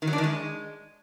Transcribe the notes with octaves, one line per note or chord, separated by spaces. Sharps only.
D#3
F#3
D4
D#3
G#3